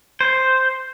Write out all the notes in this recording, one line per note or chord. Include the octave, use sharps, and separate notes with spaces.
C5